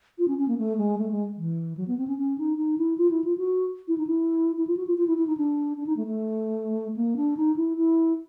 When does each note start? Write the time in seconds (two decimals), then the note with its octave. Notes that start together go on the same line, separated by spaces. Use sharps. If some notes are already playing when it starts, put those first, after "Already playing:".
0.18 F4
0.28 C#4
0.38 C#4
0.48 A#3
0.58 A3
0.78 G#3
0.98 A3
1.11 G#3
1.38 E3
1.77 F#3
1.88 B3
1.98 C4
2.07 C#4
2.18 C#4
2.38 D#4
2.58 D#4
2.78 E4
2.98 F4
3.11 E4
3.24 F4
3.38 F#4
3.88 E4
3.98 D#4
4.07 E4
4.57 E4
4.67 F4
4.77 F#4
4.87 F4
4.97 F4
5.07 E4
5.17 E4
5.27 D#4
5.37 D4
5.77 D4
5.86 D#4
5.97 A3
6.07 A3
6.96 A#3
7.17 D4
7.37 D#4
7.56 E4
7.77 E4